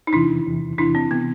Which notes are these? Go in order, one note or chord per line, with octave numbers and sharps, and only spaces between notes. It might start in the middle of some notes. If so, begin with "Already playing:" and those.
D#4
E2 C3 E3 D4 E4
E2 C3 E3
E2 C3 E3 D4 E4
C4
C3 E3 B3